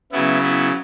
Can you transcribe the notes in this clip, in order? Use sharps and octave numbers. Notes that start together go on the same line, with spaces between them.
C#3 F#3 B3 E4
B3 E4